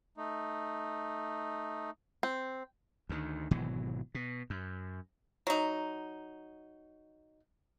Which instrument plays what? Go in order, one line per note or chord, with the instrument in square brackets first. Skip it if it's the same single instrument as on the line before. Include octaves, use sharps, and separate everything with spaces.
[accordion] A3 D#4
[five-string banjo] C4
[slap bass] D2 D#3
G#1 B2 E3 F#3
B2
F#2
[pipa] F#3 D#4